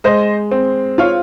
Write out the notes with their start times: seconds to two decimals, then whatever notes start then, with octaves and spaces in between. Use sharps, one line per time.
0.04 G#3 C5 D#5
0.51 C4
0.98 F4 C#5 F5